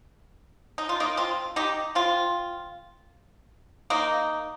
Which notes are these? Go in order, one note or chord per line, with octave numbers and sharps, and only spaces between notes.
D#4
F4
A#3 D#4
C4 F4
D#4 G4
C4 F4
A#3 D#4